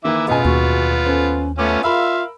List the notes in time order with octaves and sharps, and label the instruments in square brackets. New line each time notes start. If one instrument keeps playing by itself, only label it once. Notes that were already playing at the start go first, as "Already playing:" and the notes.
[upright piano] D#3 A#3 [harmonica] E3 E5 D6
[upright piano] E1 A1 G#5 [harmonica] B3 F4 [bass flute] D#5
[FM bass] D#2 [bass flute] F#4
[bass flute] C#4 [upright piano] A4 B4 C5
[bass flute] A3 [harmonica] B3 C#4 F4 [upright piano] D6
[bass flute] F4 [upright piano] A#4 B5 E6 [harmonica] E5 F5